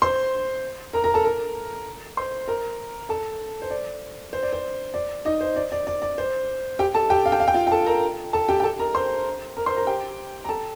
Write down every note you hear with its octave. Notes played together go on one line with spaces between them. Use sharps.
C5 C6
A#4 A#5
A#4 A#5
A4 A5
A#4 A#5
C5 C6
A#4 A#5
A4 A5
C5
D5
C5
D5
C5
D5
D#4 D#5
C5
D5
D5
D5
D5
C5
G4 G5
A4 A5
G4 G5
F5
G5
F5
G5
F4 F5
G5
A4 A5
A#4 A#5
A4 A5
G4 G5
G5
A4 A5
A#4 A#5
C5 C6
A#4 A#5
C5 C6
A#4 A#5
G4 G5
A#5
A4 A5